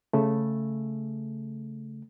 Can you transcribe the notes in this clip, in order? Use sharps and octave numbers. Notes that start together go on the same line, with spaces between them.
C#3 A3